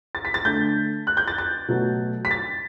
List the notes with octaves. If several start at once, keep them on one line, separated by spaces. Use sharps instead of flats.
A6
B6
A6
D3 A3 G6
F#6
G6
A6
A6
B2 F#3 A3
B6
A6